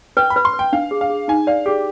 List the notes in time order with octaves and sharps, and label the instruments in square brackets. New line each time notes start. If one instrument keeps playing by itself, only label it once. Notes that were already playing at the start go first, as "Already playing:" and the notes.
[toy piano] B4 [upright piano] G5
[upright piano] B5
[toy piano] B4
[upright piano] C6
[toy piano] B4
[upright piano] G5
[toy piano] D4 [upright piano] F5
[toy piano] G#4
[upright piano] F5
[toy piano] G#4
[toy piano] D#4 [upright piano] G#5
[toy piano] D5 [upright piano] F5
[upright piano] G4 [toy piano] G#4